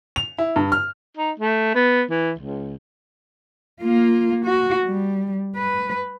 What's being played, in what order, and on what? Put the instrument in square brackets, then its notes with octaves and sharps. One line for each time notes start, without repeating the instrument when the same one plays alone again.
[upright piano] F7
E4
G2
F6
[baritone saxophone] D#4
A3
B3
E3
C#2
[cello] A#3 F4
F#4
G3
B4